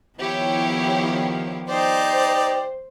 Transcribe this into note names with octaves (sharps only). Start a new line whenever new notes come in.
D#3 F3 B3 E4 G4 C#5
D#4 G4 C5 D5